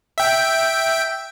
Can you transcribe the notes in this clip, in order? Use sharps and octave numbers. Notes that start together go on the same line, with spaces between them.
E5 G5